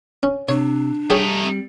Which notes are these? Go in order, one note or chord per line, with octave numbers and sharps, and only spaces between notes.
C#4
C3 D4 C#5
G3 A3 D#4 G4 G#4 C#5
C4